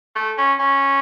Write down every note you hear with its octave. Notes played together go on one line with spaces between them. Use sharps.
A3
C#4
C#4